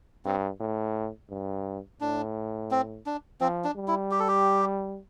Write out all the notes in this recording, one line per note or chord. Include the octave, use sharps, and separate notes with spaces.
G2 C4
A2
G2
A2 D4
C4
D4
F3 C4
D4
G3
E4
G4
A4
G4